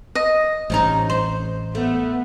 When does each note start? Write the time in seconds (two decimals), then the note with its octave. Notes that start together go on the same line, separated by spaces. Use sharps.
0.15 D#5
0.70 A1 C3 C#4 D#4
1.10 C5
1.75 A3 B3